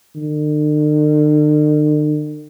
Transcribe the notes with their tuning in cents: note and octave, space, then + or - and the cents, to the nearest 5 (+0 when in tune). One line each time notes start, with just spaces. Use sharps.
D3 +45